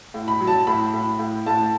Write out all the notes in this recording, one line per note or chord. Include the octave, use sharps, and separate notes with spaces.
A2
B5
F#3
A5
A2 B5
A2
A2
A2 A5